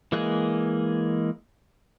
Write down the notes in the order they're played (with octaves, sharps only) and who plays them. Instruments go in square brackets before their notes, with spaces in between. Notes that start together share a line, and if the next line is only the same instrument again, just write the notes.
[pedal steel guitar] E3 G#3 A#3 G#4 F#6